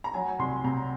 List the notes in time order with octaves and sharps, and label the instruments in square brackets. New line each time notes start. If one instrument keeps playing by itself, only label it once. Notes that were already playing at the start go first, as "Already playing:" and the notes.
[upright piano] A#5
F#3 G#5
C2 C6
C3 A#5